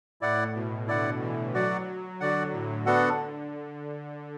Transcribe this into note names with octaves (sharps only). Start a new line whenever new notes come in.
A2 E4 D5 F#5
B2
D3 E4 D5 F#5
E3
F#3 F#4 D5 F#5
D3 F#4 D5 F#5
A2
D3 B3 D4 F#4 A4 F#5